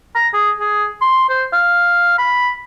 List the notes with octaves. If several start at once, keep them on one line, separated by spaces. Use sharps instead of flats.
A#5
G#4
G#4
C6
C5
F5
B5